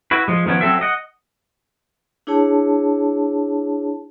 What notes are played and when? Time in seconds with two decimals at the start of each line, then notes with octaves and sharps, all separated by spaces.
0.11 E4 F#4 B4
0.28 F3 G#3
0.46 D#3 F3 B3 C#4
0.61 F#3 C4 A4 E5
0.81 D#5 F#5
2.27 D4 E4 G#4 C#5 A5